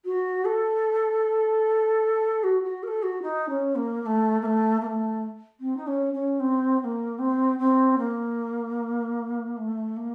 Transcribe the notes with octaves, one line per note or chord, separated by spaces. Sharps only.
F#4
A4
F#4
F#4
A#4
A4
F#4
D#4
C#4
A#3
A#3
A3
A#3
A3
A#3
A3
C4
D#4
C#4
C#4
C4
C4
A#3
C4
C4
A#3
A3
A#3